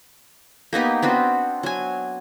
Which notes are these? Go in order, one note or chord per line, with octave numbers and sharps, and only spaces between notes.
A#3 B3 D#4 G4
B3 C4 D4 F#4
F#3 G#5